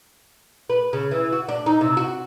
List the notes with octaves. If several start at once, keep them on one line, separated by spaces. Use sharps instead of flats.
B4
C#3
E3
F#4
D4
D#4
C3
F#4